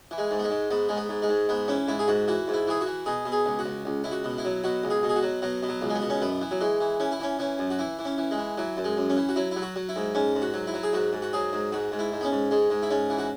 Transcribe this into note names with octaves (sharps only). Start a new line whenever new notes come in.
E3
G#3
G#2
B3
G#3
G#2
G#2 B3
G#2 G#3
B3
G#2
G#3
G#2
G#2 B3
E3 C#4
G#2 E4
G#4
G#2 F#4
E3 F#4
G#2
E4
E3 G#4
F#4
E3
B2 G#4
B2
G#4
C#2
F#4
C#2
C#2
C#2 E4
F#4
B2
E4
F#3
B2 F#4
C#2
G#4
B2
G#4
F#4
F#3
B2 F#3
B2
F#3
C#2
G#3
B3
B2
C#4
F#2 B3
E3
F#3
E3 G#3
E3
E3 C#4
E4
E3 C#4
E3 C#4
F#2
F#4
E3 E4
E3
C#4
E3
G#3
E3
E3 F#3
F#2
G#3
F#2
C#4
E3
F#4
F#3 E4
E4
F#3
F#4
F#3
E4
G#2
G#2 C#4
G#2
F#4
F#3
E4
F#3
G#4
G#2 F#4
G#2
F#4
F#3 G#4
G#2
G#2 F#4
G#2
E4
G#2
B3
C#4
G#2
G#2 G#3
G#2
E4
G#2 C#4
E3
F#4